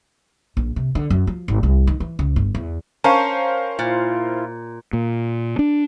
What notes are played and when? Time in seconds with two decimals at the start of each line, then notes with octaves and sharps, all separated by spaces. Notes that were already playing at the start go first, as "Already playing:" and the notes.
0.57 A#1
0.76 C3
0.95 D3
1.10 F#2
1.27 F3
1.48 G#1
1.63 C2
1.87 D#3
2.00 E3
2.19 C#2
2.36 G1
2.55 E2
3.04 C#4 A#4 C5 F5 A5 A#5
3.79 A#2 E4 F4
4.93 A#2
5.59 D4